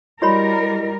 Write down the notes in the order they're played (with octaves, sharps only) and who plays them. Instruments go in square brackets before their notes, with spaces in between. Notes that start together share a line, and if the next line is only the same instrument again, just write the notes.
[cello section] G3 A#4 [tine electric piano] E4 D#5 [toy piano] F#4 C#5 B5